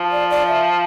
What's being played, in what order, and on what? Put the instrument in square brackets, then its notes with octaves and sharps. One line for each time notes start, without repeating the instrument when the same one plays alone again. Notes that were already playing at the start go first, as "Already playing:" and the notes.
Already playing: [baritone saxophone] F3
[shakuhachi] D5
D5
E5